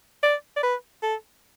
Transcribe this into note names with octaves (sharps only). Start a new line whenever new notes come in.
D5
D5
B4
A4